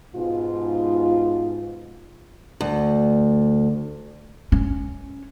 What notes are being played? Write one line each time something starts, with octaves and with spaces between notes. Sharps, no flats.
G#2 B2 F4
D2
C#4